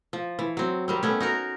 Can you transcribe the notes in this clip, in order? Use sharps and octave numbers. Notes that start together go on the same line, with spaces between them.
F3
E3
F#3 C4
D#3 G3 C4
A3 B3 C#4
D#4 F#4 A#4